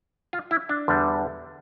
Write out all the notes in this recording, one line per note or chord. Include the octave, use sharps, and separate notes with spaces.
F4
E4
D4
E2 D3 G3